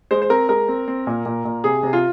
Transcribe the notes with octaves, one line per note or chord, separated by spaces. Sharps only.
G#3 C5
C5
C4 A#4
G#3 A#4
C4
C4
A#2
A#2
A#2
C3 G#4
C3
F4